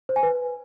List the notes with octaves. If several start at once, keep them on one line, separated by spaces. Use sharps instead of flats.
C5
G#5
B4